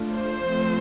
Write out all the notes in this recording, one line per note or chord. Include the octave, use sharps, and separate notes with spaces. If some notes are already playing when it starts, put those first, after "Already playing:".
Already playing: A3 D4 F4
C5
F3 A3 C4